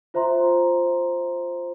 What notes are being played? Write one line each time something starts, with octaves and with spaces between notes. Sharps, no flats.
F4 C5 E5 A#5 C6